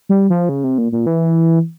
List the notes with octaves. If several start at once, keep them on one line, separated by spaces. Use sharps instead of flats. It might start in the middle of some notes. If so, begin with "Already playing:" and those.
G3
F3
C#3
C3
A#2
A#2
E3